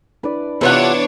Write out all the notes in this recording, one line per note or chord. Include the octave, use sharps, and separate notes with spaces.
D4 E4 B4 D5
C3 E3 B3 D4 F4 B4 C#5 F#5